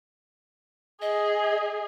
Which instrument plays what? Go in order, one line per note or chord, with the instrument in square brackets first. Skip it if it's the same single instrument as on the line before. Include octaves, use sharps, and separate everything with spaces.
[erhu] G#4 [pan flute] D#5